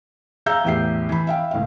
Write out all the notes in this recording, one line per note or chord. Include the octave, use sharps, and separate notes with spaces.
G#4 E5 F5 A#5 E6 G6
E2 A2 G4 E5 C7
E3 B5
E5 F5 G5
C#2 A2 F5